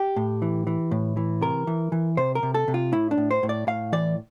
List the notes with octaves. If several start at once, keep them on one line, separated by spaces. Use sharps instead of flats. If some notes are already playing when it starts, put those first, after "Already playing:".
Already playing: G4
A2
E3
E3
A2
E3
C3 A#4
E3
E3
C3 C5
A#4
C3
A4
C3
F4
A2 E4
D4
A2
C5
A2
D5
A2 F5
E3 D5